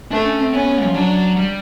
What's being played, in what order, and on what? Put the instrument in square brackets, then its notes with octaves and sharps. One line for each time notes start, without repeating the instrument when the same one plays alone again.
[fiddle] A3 [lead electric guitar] D4
[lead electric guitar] C#4
C4
[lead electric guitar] B3 [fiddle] C#4
[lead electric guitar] F3
[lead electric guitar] F#3 [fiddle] D4
[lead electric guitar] G3